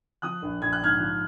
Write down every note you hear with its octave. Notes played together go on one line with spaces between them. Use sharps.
F3 D#6 F#6
A#1
A#1 G#6
F#6
G#2 F6 G#6
F3